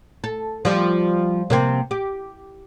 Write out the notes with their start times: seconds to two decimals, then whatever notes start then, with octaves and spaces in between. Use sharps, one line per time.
0.24 A4
0.65 F3 G3
1.50 C3 A#3 C4
1.91 G4